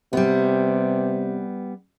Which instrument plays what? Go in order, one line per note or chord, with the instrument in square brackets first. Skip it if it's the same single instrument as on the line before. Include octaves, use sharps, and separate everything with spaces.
[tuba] C3 [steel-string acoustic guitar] G3 B3